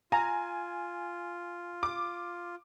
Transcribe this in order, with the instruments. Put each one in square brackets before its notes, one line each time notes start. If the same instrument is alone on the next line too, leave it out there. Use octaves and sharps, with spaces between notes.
[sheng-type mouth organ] F4 [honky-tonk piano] G#5 [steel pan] A#5
[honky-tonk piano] D6